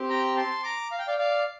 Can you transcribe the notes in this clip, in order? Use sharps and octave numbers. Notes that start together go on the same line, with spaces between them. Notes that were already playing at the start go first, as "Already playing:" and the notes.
Already playing: C4 G4
G5 A#5
A5 C6
A#5 D6
F5
G5
D5 F5
D5 F5